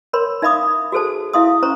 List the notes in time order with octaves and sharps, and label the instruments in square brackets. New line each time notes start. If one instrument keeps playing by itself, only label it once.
[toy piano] A#4 C#5 B5 C6
D#4 E5 F5 B5 D6 D#6
F#4 G#4 A4 C5 A5
E4 E5 F5 C6 D#6
C#4 C5 A#5 C#6